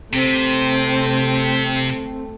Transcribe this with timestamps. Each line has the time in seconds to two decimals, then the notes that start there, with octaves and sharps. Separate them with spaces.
0.13 C3 A3 C4